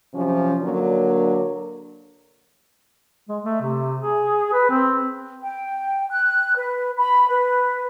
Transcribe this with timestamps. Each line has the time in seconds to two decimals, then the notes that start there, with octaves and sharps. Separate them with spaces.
0.14 C3 F3 F#3 C#4
0.62 D3 F#3 A#3 D4 A#4
3.29 G#3
3.44 A3
3.62 C3
4.00 G#4
4.54 B4
4.70 C4
5.42 G5
6.11 F#6
6.56 B4
6.97 B5
7.29 B4